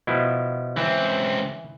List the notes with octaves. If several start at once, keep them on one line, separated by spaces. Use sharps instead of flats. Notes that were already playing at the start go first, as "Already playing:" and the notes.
B2 F3 E4
C#2 E3 C4